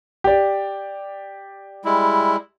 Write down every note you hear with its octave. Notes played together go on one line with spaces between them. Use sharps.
G4 D5
G3 G#3 E4